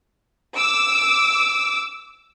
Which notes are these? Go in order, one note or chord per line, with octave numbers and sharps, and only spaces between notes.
D6 E6